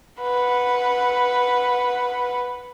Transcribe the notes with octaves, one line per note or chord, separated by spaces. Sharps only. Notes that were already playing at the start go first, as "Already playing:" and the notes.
B4 F#5